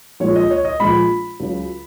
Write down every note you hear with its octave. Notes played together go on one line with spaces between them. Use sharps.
A#1 A#2 G#3 C#5
D#5
C#5
D#5
A#1 A#2 G#3 B5
C#2 C#3 F#3